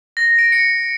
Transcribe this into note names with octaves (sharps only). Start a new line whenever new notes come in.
A#6
D7
C#7